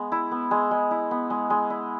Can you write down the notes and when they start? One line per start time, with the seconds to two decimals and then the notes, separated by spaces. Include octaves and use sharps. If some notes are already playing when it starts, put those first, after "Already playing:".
Already playing: G#3 B3
0.12 E4
0.31 B3
0.51 G#3
0.71 G#3
0.91 E4
1.11 B3
1.30 G#3
1.50 G#3
1.70 E4